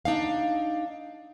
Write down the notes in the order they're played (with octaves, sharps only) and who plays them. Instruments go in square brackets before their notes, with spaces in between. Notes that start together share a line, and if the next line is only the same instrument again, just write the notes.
[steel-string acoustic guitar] D4 D#4 F5